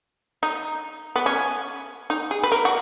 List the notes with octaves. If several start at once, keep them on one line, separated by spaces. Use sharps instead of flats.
D#4
B3
C#4
D#4
G#4
B4
A#4
F#4